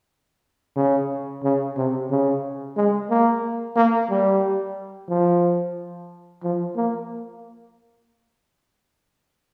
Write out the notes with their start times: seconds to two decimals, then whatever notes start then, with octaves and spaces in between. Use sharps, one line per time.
0.77 C#3
1.43 C#3
1.77 C3
2.10 C#3
2.77 G#3
3.10 A#3
3.76 A#3
4.10 G3
5.09 F3
6.44 F3
6.77 A#3